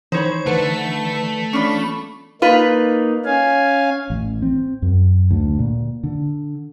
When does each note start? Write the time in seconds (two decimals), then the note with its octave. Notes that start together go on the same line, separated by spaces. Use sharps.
0.12 E3 D#4 C5 C#5 B5
0.46 D3 A3 B4 A5
1.53 C#4 D4 F4 B5 C#6
2.42 A#3 D#4 F4 B4
3.25 C#4 F5 G#5
4.10 A1
4.42 C4
4.82 F#2
5.31 D2
5.59 A#2
6.03 D3